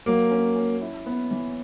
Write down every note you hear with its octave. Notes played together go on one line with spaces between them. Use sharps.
F#3 A#3
C#4
C#4
E4
B3
E3